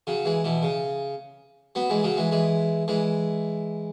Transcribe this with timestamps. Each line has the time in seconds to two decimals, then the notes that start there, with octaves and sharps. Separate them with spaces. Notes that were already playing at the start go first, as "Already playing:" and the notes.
0.07 C#3 F#3
0.25 E3 G#3
0.44 B2 E3
0.63 C#3
1.75 F#3 B3
1.90 E3 G#3
2.04 C#3 F#3
2.17 E3 G#3
2.31 E3 G#3
2.88 E3 G#3